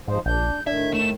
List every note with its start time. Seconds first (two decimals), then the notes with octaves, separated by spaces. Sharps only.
0.08 G#2 F3 D#4 C5
0.26 A#1 D4 G6
0.67 A2 D#3 D4 E5 G#6
0.94 A3 E7